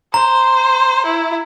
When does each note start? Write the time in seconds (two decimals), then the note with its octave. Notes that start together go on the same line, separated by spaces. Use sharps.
0.14 C5 A#5
1.06 E4